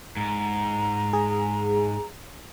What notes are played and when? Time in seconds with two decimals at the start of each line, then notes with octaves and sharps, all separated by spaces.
0.17 G#2 A#5
1.13 G#4